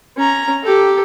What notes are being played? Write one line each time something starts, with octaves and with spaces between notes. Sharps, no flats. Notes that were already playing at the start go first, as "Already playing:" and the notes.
C#4 A#5
G4 A4